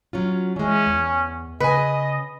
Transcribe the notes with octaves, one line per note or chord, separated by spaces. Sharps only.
F#3 C#4 F4
E3 G#3 C#4
E2
C#3 B4 D#5 G#5